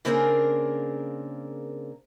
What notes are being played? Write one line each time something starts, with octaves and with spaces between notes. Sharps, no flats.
C#3 A#3 C4 D4 G#4 A#4